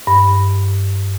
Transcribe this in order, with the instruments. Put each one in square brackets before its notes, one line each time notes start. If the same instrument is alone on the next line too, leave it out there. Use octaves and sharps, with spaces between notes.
[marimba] G2